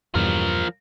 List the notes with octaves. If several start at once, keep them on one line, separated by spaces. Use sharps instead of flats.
E2 G2 B2 F3 A#4